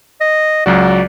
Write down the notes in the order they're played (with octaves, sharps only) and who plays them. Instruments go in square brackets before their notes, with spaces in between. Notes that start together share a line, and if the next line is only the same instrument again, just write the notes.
[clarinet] D#5
[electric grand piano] C#2 F#3 F#4 [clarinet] D5